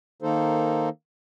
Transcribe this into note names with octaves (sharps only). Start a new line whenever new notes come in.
D#3 A#3 D#4 A4 C5